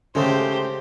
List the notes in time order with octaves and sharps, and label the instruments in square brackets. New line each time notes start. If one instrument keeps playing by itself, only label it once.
[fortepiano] C#3 A4 [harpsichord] G#3 A3 [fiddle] G4 C5